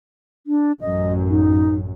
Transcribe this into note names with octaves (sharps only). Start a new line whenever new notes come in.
D4
A1 F#2 D#5
D#4